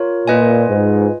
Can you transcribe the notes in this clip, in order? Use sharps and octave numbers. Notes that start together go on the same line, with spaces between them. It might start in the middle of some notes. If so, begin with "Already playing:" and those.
Already playing: F4 A#4 C#5
A#2 F4 B4 D#5 G#5
G#2